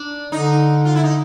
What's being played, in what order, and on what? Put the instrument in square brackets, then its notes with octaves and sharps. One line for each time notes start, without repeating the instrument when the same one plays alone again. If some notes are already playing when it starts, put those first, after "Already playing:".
Already playing: [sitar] D4
[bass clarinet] D3 [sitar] D#4
[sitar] F4
E4
D#4